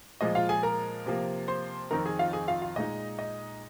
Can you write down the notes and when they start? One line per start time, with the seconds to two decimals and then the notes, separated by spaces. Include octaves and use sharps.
0.21 A#2 F3 G#3 D#5
0.35 F4 F5
0.49 G#4 G#5
0.63 A#4 A#5
1.06 C3 F3 A#3
1.48 C5 C6
1.91 F2 D#3 C4 D#4 A#4 A#5
2.05 G#4 G#5
2.19 F4 F5
2.33 G#4 G#5
2.48 F4 F5
2.62 F4 F5
2.76 A#2 G#3 D#4 D#5
3.19 D#5